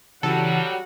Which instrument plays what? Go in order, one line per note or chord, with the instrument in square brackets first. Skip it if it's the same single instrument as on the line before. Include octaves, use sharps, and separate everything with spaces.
[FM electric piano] C#3 E3 [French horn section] F#3 G3 [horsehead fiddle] F#4 F#5 [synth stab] A4